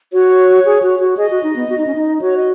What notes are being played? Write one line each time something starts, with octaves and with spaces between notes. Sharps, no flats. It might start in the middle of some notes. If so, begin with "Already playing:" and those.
F#4 C#5
G#4
F#4
F#4
G#4 D#5
F#4
D#4
B3
F#4
D#4
C#4
D#4
F#4 C#5
D#5